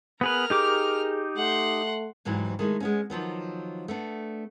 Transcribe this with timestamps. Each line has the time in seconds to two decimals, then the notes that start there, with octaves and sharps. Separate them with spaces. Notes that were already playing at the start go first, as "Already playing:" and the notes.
0.21 B3 G#4 A#4 B4 F6
0.50 D#4 G4 G#4 D6
1.37 A3 F#5 C6
2.25 D2 G#2 E3 F#3 G3
2.59 D#3 G#3 A3
2.80 G#3 B3 C#4
3.10 D#3 F3 F#3 B3
3.88 A3 B3 D4